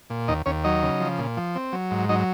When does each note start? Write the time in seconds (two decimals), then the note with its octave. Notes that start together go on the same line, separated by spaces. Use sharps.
0.10 A#2
0.28 D#2 D#4 D#5
0.46 D#2 C#4 C#5
0.64 F#3 D#4 D#5
0.83 C#3
1.00 F3
1.18 A#2
1.37 F3
1.55 C4
1.73 F#3
1.91 G#2
2.09 F#3 D#4 D#5